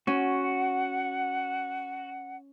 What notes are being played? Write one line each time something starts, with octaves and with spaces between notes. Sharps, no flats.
C#4 F#4 F#5